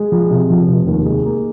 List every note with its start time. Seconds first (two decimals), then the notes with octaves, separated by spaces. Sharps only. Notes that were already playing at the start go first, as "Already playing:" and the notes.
Already playing: G#3
0.12 F3
0.31 C3
0.50 F3
0.68 F1
0.86 D#2
1.06 G#3
1.25 A#3